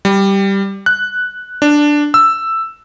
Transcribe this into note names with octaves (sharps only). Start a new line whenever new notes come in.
G3
F#6
D4
E6